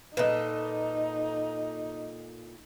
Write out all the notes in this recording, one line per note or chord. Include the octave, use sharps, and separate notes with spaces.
A#2 D#4 A4 B4 D#5